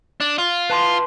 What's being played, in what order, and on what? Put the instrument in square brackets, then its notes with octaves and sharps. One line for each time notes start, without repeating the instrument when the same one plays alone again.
[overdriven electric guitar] D4
F4
[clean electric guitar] B4 A5 C6